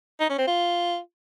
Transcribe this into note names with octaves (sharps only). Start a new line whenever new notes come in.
D#4
C#4
C4
F4